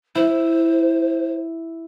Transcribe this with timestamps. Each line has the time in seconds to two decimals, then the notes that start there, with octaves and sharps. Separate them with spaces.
0.15 E4 C5